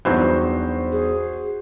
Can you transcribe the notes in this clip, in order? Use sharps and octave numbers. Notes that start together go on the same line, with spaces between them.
E2 G2 E3 F#3 D#4 F#4 C5 G6
G#4